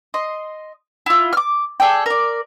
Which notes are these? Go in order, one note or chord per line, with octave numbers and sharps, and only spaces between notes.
D#5 C6
E4 F4
D6 F6
G#4 A4 D5 G5
A#4 D5